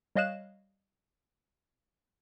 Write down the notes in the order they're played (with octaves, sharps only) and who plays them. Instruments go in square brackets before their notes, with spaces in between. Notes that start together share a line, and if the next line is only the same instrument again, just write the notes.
[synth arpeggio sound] G3 C#5 D#5 F5 F#6 E7